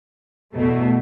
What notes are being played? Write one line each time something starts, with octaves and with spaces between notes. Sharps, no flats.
E2 B2 A3